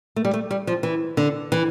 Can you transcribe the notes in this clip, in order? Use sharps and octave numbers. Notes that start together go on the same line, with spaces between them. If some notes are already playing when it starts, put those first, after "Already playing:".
A3
G3
A3
G3
F3
E3
D3
E3